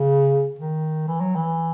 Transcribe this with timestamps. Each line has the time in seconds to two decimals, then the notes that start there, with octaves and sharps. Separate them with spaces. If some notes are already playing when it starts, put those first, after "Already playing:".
Already playing: C#3
0.59 D#3
1.08 E3
1.21 F#3
1.35 E3